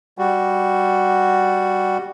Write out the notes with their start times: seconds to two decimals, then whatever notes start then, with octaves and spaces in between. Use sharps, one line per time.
0.18 G3 F#4